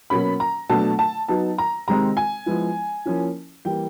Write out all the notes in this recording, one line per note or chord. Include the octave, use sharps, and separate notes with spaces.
B2 F#3 A#3 C#4 B5
A#5
B2 F#3 A3 D4 A5
A5
F#3 B3 D#4 A5
A#5
C3 D#3 G#3 C4 D#4 A#5
G#5
F3 G#3 B3 E4
F3 A#3 C#4 E4
E3 G3 A#3 G5